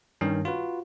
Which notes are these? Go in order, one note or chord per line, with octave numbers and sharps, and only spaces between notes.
G2 D#3 C#4
F4 F#4 B4